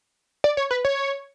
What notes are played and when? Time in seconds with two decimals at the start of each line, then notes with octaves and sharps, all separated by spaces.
0.44 D5
0.57 C#5
0.71 B4
0.85 C#5